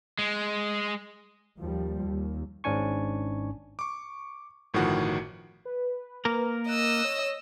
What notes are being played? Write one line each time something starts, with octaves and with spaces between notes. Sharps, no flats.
G#3
D#2 F3 G3
D#2
G#1 G#2 C#4 D4 G#5 C#6
C#6 D6
G1 A2 D#3 F3 F#4 F#5
B4
A#3 A#4
D#5 E6 F#6
C#5